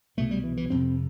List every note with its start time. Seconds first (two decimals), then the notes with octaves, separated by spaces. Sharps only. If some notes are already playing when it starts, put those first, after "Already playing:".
0.17 C2 B2 A3
0.31 G3
0.44 E3
0.57 E3
0.70 F2 C3 C4